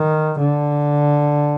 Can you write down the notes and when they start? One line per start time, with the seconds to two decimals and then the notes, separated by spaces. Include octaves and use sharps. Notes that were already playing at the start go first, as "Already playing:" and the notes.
Already playing: D#3
0.39 D3